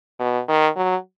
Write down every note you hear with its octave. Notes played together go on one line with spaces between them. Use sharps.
B2
D#3
F#3